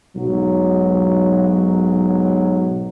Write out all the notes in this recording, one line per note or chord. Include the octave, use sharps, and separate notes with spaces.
B1 G#2 F#3